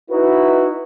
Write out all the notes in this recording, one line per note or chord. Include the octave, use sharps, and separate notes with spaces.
D#4 E4 F#4 B4